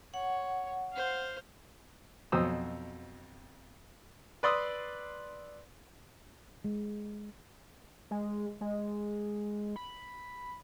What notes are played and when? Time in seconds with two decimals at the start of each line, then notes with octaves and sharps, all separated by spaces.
0.14 C#5 F#5
0.92 C5 F5
2.32 F2 B2 F#3 C5 D#6 E6
4.43 B4 D5 C6 D#6 E6
6.64 G#3
8.11 G#3
8.61 G#3
9.76 B5